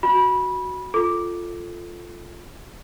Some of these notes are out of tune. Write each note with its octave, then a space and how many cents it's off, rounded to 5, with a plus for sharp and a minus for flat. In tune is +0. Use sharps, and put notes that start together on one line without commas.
F#4 +0 B5 -20
F4 +0 A4 +0